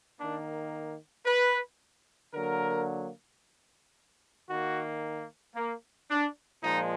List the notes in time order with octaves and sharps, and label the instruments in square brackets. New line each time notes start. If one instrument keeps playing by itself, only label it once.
[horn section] D#3 A#3 D4
B4
D3 F#3 A#3 A#4
D#3 A#3 F#4
A#3
D4
A#2 F3 G#3 D#4